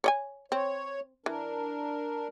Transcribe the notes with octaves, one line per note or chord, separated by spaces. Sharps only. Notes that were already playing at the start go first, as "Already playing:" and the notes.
C#5 D#5 G#5
C4 C#5
E3 D4 A#4